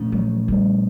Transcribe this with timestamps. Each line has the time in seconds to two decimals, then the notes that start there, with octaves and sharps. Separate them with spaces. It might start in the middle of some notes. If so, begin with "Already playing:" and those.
Already playing: A#2 F3 A3 C#4
0.12 F#3
0.48 G3